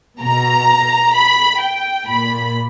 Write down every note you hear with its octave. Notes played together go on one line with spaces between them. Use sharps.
B2 A#5
B5
G5
A#2 B5